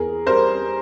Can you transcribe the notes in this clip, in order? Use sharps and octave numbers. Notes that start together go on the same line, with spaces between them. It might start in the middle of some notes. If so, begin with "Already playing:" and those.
Already playing: E2 G#4 A#4
G3 A#4 C5